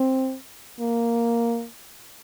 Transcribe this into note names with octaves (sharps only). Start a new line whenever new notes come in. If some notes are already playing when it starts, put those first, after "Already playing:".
Already playing: C4
A#3